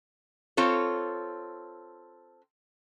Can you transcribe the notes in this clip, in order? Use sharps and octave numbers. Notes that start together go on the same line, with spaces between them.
C4 F4 A4 C#5